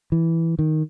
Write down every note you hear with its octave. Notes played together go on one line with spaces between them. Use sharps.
E3
D#3